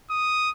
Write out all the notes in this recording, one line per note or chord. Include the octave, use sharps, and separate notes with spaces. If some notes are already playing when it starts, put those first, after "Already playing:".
D#6